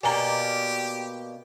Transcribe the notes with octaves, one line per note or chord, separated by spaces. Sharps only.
B2 A#3 G4 D5 G#5 A#5